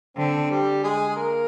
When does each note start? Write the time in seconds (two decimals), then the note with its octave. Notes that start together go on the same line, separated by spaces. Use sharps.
0.17 D3 C4
0.50 G3 G4
0.83 G#3 G#4
1.09 G#4
1.16 A#3 A#4